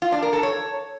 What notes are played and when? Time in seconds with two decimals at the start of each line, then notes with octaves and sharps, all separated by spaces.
0.02 F4
0.12 D4
0.23 A#4
0.33 A4
0.43 C#5